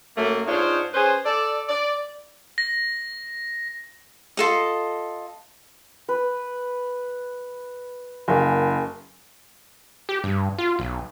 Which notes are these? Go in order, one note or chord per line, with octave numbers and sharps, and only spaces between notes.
F#2 A3 A#3
G#2 D4 D#4 F4 C5 C#5
C#4 G#4 B4 C5
A4 D5
D5
A#6
F4 A4 D#5
B4
F#1 A#3 G#5
G4
G2
F4
B1